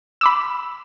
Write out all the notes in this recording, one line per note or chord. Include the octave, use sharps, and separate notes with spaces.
B5 D6 E6